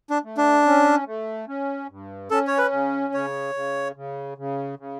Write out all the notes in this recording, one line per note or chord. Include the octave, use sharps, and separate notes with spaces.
D4
A3
D4
C#4
A3
C#4
G2
C#4 A4
C#5
B4
C#3
C#3 C#5
C#3
C#3
C#3
C#3